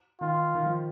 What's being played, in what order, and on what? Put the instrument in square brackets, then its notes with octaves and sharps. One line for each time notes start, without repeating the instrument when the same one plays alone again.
[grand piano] D#3 [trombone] F4
[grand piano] D#3
F3